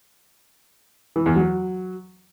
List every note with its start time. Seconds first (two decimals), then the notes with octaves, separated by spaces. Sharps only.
1.16 E3
1.26 E2
1.36 F#3